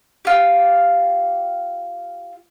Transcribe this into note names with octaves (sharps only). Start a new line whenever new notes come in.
F4 G4